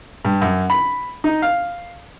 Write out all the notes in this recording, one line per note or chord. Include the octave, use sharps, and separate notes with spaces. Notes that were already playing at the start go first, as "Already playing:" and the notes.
G2
F#2
B5
D#4
F5